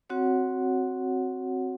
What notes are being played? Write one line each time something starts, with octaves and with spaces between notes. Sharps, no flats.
C4 F#4 C#5 F#5